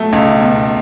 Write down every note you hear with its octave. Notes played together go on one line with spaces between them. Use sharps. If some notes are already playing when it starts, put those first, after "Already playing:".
Already playing: B2 F#3 A3
C#2
B2